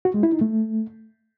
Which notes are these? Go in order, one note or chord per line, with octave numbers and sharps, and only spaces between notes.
F#4
G#3
E4
D#4
A3